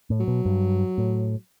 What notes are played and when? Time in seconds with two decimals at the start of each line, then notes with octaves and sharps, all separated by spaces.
0.10 A2
0.20 F#3
0.28 B2
0.45 G2
0.98 A2